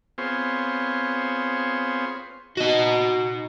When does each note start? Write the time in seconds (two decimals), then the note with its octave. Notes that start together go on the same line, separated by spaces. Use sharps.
0.18 B3 C4 F4 G#4 C5 C#5
2.57 D#4 F#4 D#5